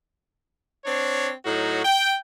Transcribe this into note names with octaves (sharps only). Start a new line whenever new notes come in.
C4 D4 C#5
A2 F#3 D#4 F#4
G5